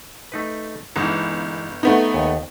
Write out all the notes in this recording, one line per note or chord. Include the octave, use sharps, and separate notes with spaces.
A3 D#4 B4
G1 E3 G#3 D#4
A3 B3 D#4
D#2